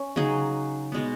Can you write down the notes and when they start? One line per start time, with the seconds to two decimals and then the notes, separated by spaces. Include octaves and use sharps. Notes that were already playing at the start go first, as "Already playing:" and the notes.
Already playing: C#4
0.16 C#3 F#3 D#4 G#4
0.92 B2 G#3 B3